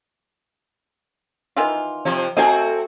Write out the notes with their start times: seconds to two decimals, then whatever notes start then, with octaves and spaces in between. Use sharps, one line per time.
1.56 D#3 E3 F4
2.05 C3 F3 C4
2.37 A3 C4 F#4 D#5 G#5